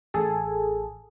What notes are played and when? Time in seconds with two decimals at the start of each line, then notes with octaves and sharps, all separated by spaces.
0.14 A1 G#4 A4